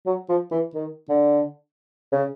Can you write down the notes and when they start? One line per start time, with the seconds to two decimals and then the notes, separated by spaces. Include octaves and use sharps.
0.06 F#3
0.29 F3
0.51 E3
0.74 D#3
1.09 D3
2.12 C#3